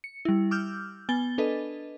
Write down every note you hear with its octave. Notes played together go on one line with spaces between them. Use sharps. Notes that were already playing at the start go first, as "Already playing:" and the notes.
C#7
G3 E4
D6 E6 F6 G6
B3 G#5 A6 G7
D4 A4 B4 D#5